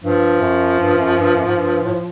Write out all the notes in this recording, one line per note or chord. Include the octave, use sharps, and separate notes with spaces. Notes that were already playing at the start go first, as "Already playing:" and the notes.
G2 F3
F#2
G2
F#2
G2
F#2
G#2
G2
A2